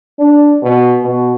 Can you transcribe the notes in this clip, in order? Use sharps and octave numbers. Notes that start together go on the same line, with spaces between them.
D4
B2
B2